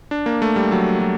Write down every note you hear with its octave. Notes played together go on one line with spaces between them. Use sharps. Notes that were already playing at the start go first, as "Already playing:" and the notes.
D4
A#3
A3
G3
F#3
F#3